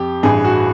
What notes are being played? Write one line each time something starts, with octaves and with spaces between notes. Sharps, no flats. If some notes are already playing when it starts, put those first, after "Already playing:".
Already playing: F2 G4
A1 G2 E3 G#4
F#4